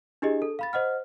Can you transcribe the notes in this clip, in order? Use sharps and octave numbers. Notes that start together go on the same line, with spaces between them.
D4 E4 G4 G#4 D#5
A4
F5 B5 A6
C5 D#5 F#5 F6